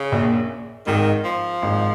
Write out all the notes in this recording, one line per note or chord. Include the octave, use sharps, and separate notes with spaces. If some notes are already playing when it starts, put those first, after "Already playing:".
Already playing: C#3
A#1 A#2
G#1 G#2 D#3
F3
G#1 G#2